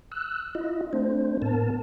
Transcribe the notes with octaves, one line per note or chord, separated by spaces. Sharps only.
E6 F#6
E4 F4 D#5
A3 C4 D4 C5
A2 B3 A#4 A5